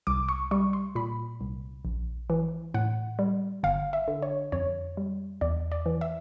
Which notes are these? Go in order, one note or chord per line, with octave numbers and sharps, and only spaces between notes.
C2 D6
C#6
G3 C#6
C6
A#2 B5
C2
A#1
E3
A2 F#5
G3
G1 F5
E5
D3
C#5
F2 C#5
G3
E2 D5
D5
E3
E5